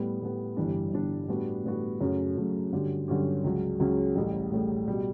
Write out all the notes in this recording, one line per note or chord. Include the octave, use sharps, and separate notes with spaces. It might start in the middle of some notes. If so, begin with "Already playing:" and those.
Already playing: A2 G3 B3
A2 G3 B3
G1 G2 E3 G3 D4
G1 G2 E3 G3 D4
A2 G3 B3 D4 F#4
A2 G3 B3 D4 F#4
F#2 C#3 F#3 A3 C#4
F#2 C#3 F#3 A3 C#4
G2 D3 F#3 C#4 G4
G2 D3 F#3 C#4 G4
C#2 C#3 F#3 C#4
C#2 C#3 F#3 C#4
A1 A2 G3
A1 A2 G3
B2 G3